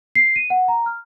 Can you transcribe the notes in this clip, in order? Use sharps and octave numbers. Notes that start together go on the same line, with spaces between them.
C7
D#7
F#5
A#5
F6